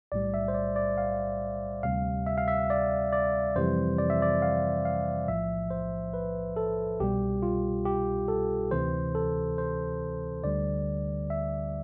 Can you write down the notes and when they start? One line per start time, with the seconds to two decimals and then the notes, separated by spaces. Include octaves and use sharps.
0.12 B1 A2 G3 D5
0.34 E5
0.48 C5
0.54 D5
0.76 D5
0.98 F5
1.83 D2 C3 G3 F5
2.27 E5
2.38 F5
2.48 E5
2.70 D5
3.13 D5
3.56 F2 C3 E3 G3 C5
3.98 D5
4.10 E5
4.22 D5
4.42 F5
4.85 F5
5.28 B1 A2 F3 E5
5.71 C5
6.14 B4
6.57 A4
7.00 C2 B2 G3 G4
7.42 F4
7.86 G4
8.28 A4
8.71 D2 C3 E3 C5
9.15 A4
9.58 C5
10.44 D2 D3 G3 D5
11.30 E5